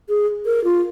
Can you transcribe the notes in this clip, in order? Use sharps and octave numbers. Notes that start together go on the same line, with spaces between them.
G#4
A#4
F4